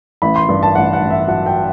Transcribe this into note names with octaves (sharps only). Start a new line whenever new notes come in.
A1 B5
C6
G2
A5
A1 F#5
F#5
A1
E5
F#3 F#5
G5